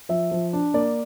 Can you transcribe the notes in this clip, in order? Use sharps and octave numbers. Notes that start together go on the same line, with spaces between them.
F3 E5
F3
D4
A#3 D5